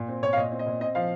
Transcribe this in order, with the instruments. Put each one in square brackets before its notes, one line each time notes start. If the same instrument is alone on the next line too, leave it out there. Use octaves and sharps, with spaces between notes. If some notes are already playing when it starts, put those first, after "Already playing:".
Already playing: [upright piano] A#2
C4
A#2 C#5
F5
A#2 D#5
C4
D#5
A#2
C4 D#5
F3 F5